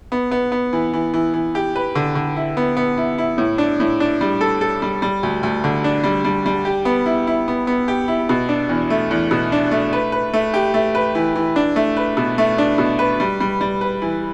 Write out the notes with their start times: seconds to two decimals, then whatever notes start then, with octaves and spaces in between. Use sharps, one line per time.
0.12 B3
0.31 B3
0.52 B3
0.73 E3
0.93 E3
1.14 E3
1.34 E3
1.55 G4
1.76 B4
1.95 D3
2.15 D3
2.36 E4
2.57 B3
2.77 B3
2.97 E4
3.18 E4
3.38 A2
3.58 D4
3.80 A2
4.00 D4
4.21 G3
4.41 A4
4.61 A4
4.82 G3
5.02 G3
5.23 D2
5.43 D2
5.64 D3
5.84 D4
6.04 G3
6.25 G3
6.46 G3
6.65 G4
6.85 B3
7.06 E4
7.27 E4
7.48 B3
7.67 B3
7.88 G4
8.08 E4
8.29 B2
8.49 D4
8.69 E2
8.90 A3
9.11 E2
9.31 B2
9.52 D4
9.71 A3
9.93 B4
10.12 B4
10.33 A3
10.54 G4
10.74 A3
10.95 B4
11.15 E3
11.35 E3
11.56 D4
11.76 A3
11.96 B4
12.17 B2
12.38 A3
12.58 D4
12.78 B2
12.99 B4
13.20 G3
13.40 G3
13.61 G3
13.81 B4
14.02 E3